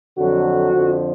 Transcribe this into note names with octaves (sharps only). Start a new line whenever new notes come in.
F2 D3 F#3 F#4
F2 D3 F3